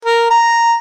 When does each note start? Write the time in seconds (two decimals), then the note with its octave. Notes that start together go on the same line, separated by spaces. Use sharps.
0.05 A#4
0.30 A#5